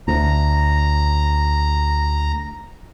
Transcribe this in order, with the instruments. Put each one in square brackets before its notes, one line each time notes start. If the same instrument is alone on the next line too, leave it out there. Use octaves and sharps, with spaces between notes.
[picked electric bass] D2 [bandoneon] A#5